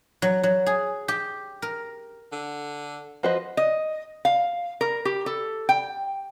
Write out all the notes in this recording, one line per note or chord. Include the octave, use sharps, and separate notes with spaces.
F#3
F#3
G#4
G4
A#4
D3
F3 F#4 B4 C5 D#5
D#5
F5
A#4
G4
A4
G5